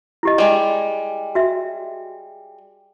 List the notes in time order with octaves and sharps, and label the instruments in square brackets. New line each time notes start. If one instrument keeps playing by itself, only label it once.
[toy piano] E4 G4 D#5
[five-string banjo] G3 G#3
[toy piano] F#4 E5